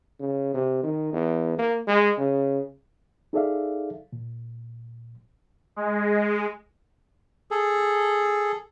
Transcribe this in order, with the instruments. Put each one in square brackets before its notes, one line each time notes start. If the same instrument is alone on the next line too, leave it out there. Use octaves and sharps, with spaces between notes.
[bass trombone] C#3
C3
D#3
E2
A#3
G#3
C#3
[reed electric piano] D#4 G#4 A4 D5 E5 F5
A#2
[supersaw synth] G#3
[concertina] G#4 A4